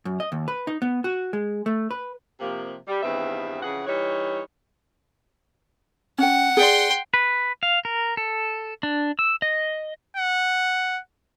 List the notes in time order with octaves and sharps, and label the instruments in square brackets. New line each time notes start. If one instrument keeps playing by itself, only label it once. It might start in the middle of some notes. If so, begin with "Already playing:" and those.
[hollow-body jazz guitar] F#2
D#5
D#2
B4
D#4
B3
F#4
G#3
A3
B4
[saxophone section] C3 F3 A#3
G3
E2 G2 D#3 B3 C4 E5
F2 C#3 E3 G#4 F#5
E3 G3 D#4 C#5
[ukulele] C#4 G5 [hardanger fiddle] F#5
[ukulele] G#4 D5 [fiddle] G5 C6
[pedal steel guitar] B4
F5
A#4
A4
D4
E6
D#5
[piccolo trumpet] F#5